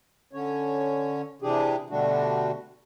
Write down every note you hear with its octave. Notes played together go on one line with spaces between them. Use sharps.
D3 C#4 C#5
C3 E3 D4 G4 G#4
B2 D3 G3 A3 D4 F#4